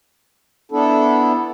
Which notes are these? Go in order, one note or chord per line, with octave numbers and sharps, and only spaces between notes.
B3 D4 E4 A4